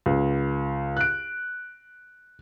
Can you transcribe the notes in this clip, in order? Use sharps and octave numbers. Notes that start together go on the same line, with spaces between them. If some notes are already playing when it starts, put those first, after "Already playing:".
C#2
F#6 D7